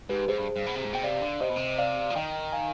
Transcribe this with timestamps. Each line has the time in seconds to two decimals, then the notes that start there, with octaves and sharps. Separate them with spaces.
0.09 G#2 G4 B4
0.28 G#2 G#4 C5
0.38 G2
0.56 G2
0.67 B2
0.75 C3
0.85 G#2
0.94 B2 G5
1.03 C3 D5 F5
1.22 D3
1.41 C3 C5 D#5
1.49 B2
1.56 C3
1.78 D5 F5
2.10 F3
2.15 D#3 D#5 G5
2.53 F5 G#5